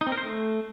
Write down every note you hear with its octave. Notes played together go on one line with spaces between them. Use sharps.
D#4
C4
A#4
C5
A3